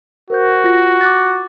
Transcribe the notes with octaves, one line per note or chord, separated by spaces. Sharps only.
F#4 A#4 C5 G6
F4 A#6
D6 F#6 A6